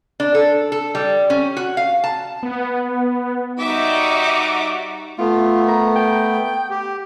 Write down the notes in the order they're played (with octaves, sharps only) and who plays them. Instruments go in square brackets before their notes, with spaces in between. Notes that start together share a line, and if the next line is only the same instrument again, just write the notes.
[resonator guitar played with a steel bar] D4
A4
A4
G3
C#4
F#4
F5
A5
[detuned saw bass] B3
[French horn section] G3 D#4 [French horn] F#4 [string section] E5 [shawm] D6
[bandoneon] A3 B3 [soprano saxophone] F4
[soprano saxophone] A#4
G5
[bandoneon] G4